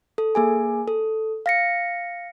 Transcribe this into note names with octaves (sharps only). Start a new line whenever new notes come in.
A4
A#3 G#4 G#5
A4
F5 A#6 C#7